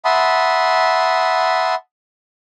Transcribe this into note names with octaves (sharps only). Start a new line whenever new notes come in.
E5 F#5 A5 B5 C6 D#6